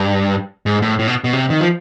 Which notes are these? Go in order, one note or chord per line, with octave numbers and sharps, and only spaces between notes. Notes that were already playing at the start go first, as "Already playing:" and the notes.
Already playing: G2
G#2
A2
A2
B2
B2
C3
D#3
F3